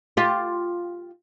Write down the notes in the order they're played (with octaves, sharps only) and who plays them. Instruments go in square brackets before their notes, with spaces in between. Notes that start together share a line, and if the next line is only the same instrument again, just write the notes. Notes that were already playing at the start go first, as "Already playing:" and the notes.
[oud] F4 G4